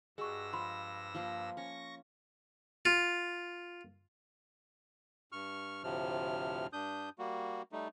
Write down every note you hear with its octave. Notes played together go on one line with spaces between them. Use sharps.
G2 G#3 F#4 G#4 C#6 E6 A#6
F3 B5 C6
F3 A#3 C5
C#4 C#6 A#6
F4
G2 C#6 F6
D2 A2 C3 F3 F6
G2 D4 D#6 G6
G3 A#3 F#4
G3 A3 D#4